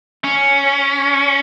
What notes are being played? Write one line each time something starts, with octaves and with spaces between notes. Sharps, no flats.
C#4